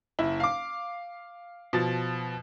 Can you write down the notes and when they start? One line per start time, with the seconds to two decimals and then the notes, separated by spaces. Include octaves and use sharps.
0.19 F#1 E4
0.40 F5 D6
1.73 B2 F3 A6